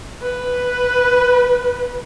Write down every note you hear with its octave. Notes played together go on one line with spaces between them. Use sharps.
B4